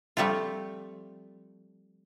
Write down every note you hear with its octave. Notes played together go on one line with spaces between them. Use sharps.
F3 G3 A3 C4 F4